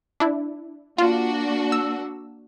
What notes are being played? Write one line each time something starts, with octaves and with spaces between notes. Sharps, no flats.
D4 E4
A#3 D4 F4 F#4
E6